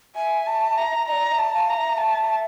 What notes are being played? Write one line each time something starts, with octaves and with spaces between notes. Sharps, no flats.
E5 G#5
A5
A#5
D5 D#5 A#5
E5
A5
F5
A#5
E5
A5